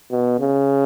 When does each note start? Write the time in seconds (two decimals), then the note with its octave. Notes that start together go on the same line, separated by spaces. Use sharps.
0.11 B2
0.39 C#3